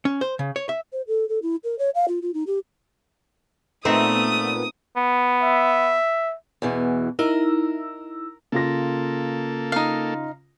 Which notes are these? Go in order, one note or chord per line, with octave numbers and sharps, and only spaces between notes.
C#4
C5
C#3
C#5
E5
C5
A4
A4
E4
A#4
C#5
F5
F4
F4
D#4
G4
A#2 A3 B3 C4 D#4 E5 D#6
B3
E5
E2 B2 E3
D#4 E4 A#4 E6
C#3 A#3 F4 A4 A#6
D#4 F5